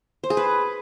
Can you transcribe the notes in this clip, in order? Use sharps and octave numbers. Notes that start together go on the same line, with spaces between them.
C5
G#4
B4